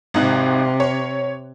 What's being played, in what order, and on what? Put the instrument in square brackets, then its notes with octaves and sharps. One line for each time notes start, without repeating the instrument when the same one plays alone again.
[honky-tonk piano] G#1 D#4 F#6 [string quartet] C3
[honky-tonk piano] C#5